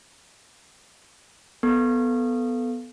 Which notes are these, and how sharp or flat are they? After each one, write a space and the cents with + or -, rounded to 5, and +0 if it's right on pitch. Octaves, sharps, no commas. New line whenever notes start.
B3 +0 A4 +0